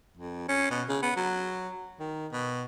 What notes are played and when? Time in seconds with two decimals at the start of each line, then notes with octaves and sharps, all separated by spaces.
0.17 F2
0.49 C#4
0.71 B2
0.89 C#3
1.02 B3
1.16 F#3
2.00 D#3
2.32 B2